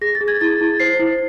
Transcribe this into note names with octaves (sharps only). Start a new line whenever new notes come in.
G#4 A#6
A6
G#4
G#6
E4 A6
E4
C5 C7
E4